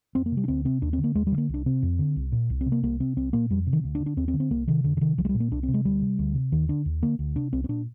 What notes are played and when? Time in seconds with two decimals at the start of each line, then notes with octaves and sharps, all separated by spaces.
0.15 F2 C4
0.26 A#3
0.32 C3
0.37 G3
0.44 D4
0.48 D2 C4
0.65 C3 C4
0.82 D#2 D4
0.93 C4
0.99 D3
1.04 A#3
1.15 D#2 G#3
1.27 G3
1.32 D3
1.38 A#3
1.49 C2 D4
1.66 C3 C4
1.83 F2
1.99 D3
2.16 C2
2.32 A#2
2.50 C2
2.61 C4
2.66 C3
2.72 A#3
2.83 C2 A#3
3.00 C3 C4
3.16 C2 C4
3.33 A#2 A#3
3.50 F2 G3
3.67 C3
3.73 D#3
3.84 D2
3.95 D4
4.00 D3
4.06 D4
4.17 D#2 C4
4.28 C4
4.34 D3
4.40 C4
4.51 C2 A#3
4.67 C3 D#3
4.84 F2 D3
4.97 D3
5.01 C3 D#3
5.18 C2 F3
5.25 G#3
5.29 G3
5.35 A#2
5.40 A#3
5.51 C2 D4
5.63 C4
5.68 C3
5.74 G#3
5.85 D2 G3
6.02 C3
6.19 D2
6.35 C3
6.52 D#2 D#3
6.69 D3 D4
6.86 D#2
7.02 D3 A#3
7.19 D2
7.36 C3 D4
7.53 C2 C4
7.64 C4
7.69 A#2 D4